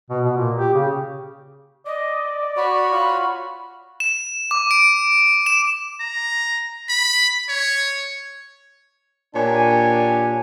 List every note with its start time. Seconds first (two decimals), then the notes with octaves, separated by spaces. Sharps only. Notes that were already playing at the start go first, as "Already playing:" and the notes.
0.10 B2
0.25 B2
0.37 A#2
0.57 G4
0.74 C#3
1.86 D5 D#5
2.57 F#4 C#5 B5
2.92 F4 B5
4.00 E7
4.51 D6
4.71 D7
5.46 E7
6.00 A#5
6.89 B5
7.49 C#5
9.35 A#2 D4 G4 C#5 G#5